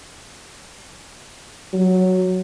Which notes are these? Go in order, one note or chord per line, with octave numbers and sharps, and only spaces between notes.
F#3